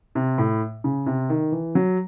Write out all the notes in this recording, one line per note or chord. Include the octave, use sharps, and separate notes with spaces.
C3
A2
C#3
C3
D#3
E3
F#3